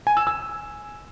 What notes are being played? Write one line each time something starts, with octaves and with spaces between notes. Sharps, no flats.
G#5
E6
E6